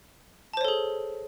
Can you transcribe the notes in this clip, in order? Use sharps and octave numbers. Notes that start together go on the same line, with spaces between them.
G#4 A4 C5 C#5 A5